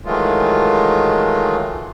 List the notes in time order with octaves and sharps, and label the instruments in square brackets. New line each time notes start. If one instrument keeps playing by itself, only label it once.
[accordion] D#3 E3 F#3 G#3 A3 F4